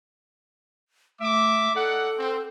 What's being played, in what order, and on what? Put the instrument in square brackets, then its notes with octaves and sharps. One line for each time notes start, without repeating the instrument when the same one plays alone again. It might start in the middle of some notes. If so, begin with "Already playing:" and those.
[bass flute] A3 [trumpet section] E5 D6
[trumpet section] D#4 D5 F#5 [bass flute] A4
[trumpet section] C4